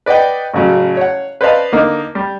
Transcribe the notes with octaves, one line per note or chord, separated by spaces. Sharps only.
B4 D5 D#5 F#5 G5
A1 C#3 F#3
C#5 F#5
B4 C5 D5 D#5 F5 A5
D3 A#3 D#4
G3